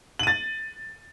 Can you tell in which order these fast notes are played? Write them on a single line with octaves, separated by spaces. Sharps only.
F#7 D#7 A6